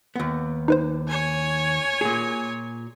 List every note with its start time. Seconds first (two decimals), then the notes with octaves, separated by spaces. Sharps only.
0.16 D#2 B3
0.68 D#4 B4 C5
1.08 C#5 G#5
2.01 A#2 G#4